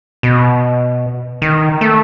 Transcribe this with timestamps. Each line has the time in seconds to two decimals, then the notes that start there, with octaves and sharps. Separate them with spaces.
0.23 B2
1.42 D#3
1.81 A3